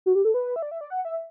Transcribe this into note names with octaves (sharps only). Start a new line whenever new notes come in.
F#4
G4
A4
B4
E5
D5
E5
D5
F#5
E5